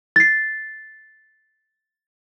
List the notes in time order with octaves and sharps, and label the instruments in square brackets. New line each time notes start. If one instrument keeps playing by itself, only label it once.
[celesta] A6 C7